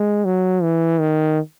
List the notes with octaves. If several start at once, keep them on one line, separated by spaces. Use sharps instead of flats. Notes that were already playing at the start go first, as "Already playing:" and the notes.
Already playing: G#3
F#3
E3
D#3